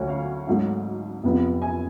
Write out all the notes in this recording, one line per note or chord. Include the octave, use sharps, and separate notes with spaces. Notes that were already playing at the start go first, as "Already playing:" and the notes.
Already playing: D2 D3 F#3 C#5
F5
G#1 G#2 F#3 A3
F1 F2 F3 B3
G#5